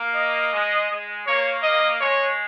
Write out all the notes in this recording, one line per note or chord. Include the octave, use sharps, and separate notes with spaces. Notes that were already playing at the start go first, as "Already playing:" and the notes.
Already playing: A#3
D#5
G#3
G#3
A#3 C#5
D#5
G#3 C#5